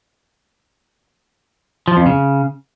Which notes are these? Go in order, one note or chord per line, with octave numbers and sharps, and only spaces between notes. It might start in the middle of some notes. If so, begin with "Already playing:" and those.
F3
F2
C#3